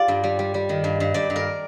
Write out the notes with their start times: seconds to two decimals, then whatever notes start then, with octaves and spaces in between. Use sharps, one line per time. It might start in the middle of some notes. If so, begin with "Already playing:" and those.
Already playing: F4 G4 D5
0.08 G2
0.24 G3
0.39 G3
0.54 G3
0.69 D#3
0.84 G2
1.00 G2
1.14 G2 D5
1.30 G2
1.36 A#4